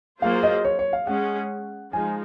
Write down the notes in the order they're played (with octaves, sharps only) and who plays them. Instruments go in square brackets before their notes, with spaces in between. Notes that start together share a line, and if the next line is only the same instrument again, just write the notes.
[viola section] F#3 A#3 F4 G#4 C5 [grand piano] F5
[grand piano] D#5
C#5
C#5
F5
[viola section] G#3 C#4 G#4 [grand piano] F#5
[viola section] F3 G#3 D#4 [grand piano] G#5